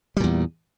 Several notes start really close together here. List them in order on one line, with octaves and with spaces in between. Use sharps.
G3 A#2 E2